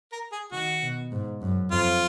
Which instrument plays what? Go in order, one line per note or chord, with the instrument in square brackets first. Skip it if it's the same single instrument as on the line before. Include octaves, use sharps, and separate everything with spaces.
[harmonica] A#4
G#4
[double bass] D#3 [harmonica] F#4
[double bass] B2
G#2
F#2
[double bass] F2 [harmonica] F4